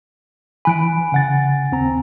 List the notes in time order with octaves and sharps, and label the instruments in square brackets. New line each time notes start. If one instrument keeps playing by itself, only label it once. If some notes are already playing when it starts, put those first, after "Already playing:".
[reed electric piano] E3 B5 [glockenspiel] G#5 F#6 D7
[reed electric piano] C#3 F#5 A6
D#2 C4 A#5